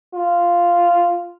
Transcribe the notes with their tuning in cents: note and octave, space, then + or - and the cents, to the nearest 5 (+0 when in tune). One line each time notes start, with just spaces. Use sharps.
F4 -5